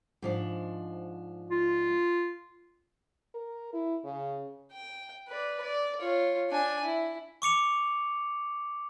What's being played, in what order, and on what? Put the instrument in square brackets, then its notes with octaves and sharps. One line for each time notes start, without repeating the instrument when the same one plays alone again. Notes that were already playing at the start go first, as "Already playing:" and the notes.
[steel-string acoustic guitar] G#2 F3 D4
[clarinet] F4
[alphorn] A#4
E4
C#3
[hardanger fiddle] G5
B4 D5
D5
F4 C#5
D4 G#5
E4
[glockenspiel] C#6 D6 C#7 F7